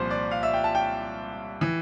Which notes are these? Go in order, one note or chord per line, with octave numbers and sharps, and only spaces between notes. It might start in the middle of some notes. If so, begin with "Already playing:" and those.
Already playing: C2 A#2 F3 C5
D5
F5
E5
G5
A5
G5
E3